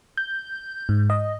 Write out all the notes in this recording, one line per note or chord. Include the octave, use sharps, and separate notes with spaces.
G6
G#2
D#5